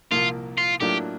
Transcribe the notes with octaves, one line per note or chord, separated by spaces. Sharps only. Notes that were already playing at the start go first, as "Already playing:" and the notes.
C2 A#2 F3 A#3 F4
F4
A2 F#3 A#3 D4 F4 G4